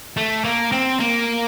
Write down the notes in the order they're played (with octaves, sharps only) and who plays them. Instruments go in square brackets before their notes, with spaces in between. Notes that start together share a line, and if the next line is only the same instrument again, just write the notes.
[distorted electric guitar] A3
A#3
C4
A#3